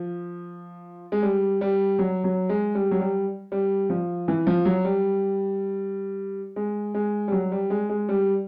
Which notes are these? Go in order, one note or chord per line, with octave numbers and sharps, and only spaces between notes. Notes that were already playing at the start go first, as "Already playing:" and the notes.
Already playing: F3
G#3
G3
G3
F#3
F#3
G#3
G3
F#3
G3
G3
F3
E3
F3
F#3
G3
G#3
G#3
G3
F#3
G3
G#3
G#3
G3